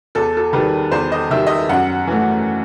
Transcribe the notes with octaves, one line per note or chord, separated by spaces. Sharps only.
E2 A4
A4
D#3 G3 B4
E2 C5
D#5
D#3 G3 E5
D#5
E5
F#2 F#5
E3 A3